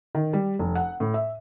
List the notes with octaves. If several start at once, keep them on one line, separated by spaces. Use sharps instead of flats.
D#3
G3
F1
F#5
A2
E5